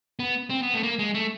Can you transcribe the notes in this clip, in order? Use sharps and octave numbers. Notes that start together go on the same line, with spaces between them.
B3
C4
B3
A3
A#3
G#3
A3